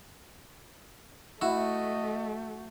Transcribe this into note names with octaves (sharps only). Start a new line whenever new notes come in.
A3 E4 F#4 D#5 E6